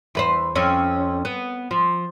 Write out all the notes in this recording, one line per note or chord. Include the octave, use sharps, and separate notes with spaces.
E2 B4 C5
F2 C4 C#4
B3
F3